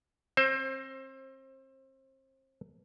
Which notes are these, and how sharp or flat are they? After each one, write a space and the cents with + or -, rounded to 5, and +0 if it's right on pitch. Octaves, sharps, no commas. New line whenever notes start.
C4 +30 C5 +20